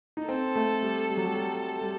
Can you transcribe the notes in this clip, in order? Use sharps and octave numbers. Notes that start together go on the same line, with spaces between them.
D#4
C4 A4
A3
G3
G3
F#3
G3
G3
G3